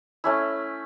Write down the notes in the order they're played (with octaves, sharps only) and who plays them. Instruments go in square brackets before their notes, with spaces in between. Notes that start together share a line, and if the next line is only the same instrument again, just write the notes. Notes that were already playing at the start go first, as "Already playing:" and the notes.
[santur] A3 C#4 E4